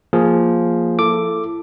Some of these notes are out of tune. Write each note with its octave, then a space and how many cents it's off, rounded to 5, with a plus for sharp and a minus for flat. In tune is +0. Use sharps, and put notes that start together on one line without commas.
F3 +0 A#3 +0 G#4 +0
E4 +35 A4 +0 D6 +0